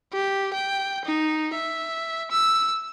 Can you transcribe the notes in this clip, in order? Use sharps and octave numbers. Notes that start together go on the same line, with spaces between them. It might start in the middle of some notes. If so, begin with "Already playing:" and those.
G4
G5
D#4
E5
E6